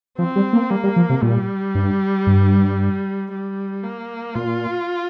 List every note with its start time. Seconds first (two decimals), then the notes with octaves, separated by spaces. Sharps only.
0.18 F3 C4
0.36 G3
0.53 A#3
0.70 G3 A#3
0.84 G3
0.96 F3
1.10 C3
1.22 A#2 G3
1.75 G2
2.27 G2
3.31 G3
3.83 A#3
4.35 A#2 F4